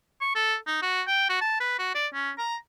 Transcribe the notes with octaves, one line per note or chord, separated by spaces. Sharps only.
C#6
A4
D#4
F#4
G5
F#4
A5
B4
F#4
D5
C#4
A#5